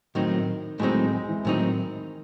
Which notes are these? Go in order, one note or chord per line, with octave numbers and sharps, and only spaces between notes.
A2 D#3 F#3 C4 D#4
A2 F#3 G#3 C4 D#4
G#3
E3
A2 D#3 F#3 C4 D#4